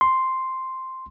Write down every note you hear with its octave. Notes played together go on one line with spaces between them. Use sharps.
C6